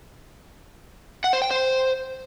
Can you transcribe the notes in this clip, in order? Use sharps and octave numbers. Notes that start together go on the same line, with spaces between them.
F#5
C5
G5
C5